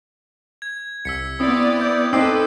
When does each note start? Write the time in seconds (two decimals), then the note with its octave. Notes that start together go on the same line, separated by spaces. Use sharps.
0.62 G#6
1.05 C2 E6 B6 C#7
1.40 B3 C4 E4 D5 D#6
1.81 G6
2.13 C4 D#4 A4 B4 D6 E6 C7